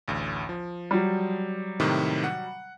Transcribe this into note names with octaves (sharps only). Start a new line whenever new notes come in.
A1 D2
F3
F#3 G3
A2 C3 D#3
F#5